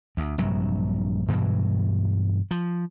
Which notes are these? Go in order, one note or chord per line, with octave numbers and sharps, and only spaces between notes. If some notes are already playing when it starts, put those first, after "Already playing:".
D2
A#1 G2 C3 F#3
G2 B2 E3 F#3
F3